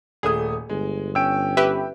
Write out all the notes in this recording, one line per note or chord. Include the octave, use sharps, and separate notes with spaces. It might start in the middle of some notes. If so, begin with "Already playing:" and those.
D#1 A3 G#4 D#6
G1 G#3
C#4 G5 E6 D7
G4 B4 E5